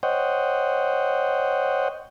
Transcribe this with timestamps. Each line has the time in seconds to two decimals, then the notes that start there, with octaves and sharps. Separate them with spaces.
0.03 C5 C#5 D#5 F#5 G5